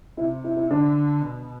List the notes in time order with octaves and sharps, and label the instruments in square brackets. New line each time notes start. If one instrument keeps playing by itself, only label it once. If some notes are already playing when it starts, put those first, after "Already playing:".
[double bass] C3 [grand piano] E4
[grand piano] E4
E4
[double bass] D3 [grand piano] D4
[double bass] B2